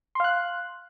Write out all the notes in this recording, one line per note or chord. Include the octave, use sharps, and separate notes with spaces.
F5 C6 F#6